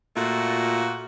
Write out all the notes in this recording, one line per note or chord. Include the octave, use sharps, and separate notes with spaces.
A#2 A3 F4 F#4